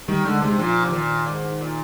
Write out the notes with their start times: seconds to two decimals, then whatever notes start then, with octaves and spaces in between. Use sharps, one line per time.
0.08 D#3 G3
0.25 D3 G#3
0.42 C3 G#3
0.59 A#2 F3
0.85 C3
0.92 A#2 D#3
1.26 G#2
1.61 A#2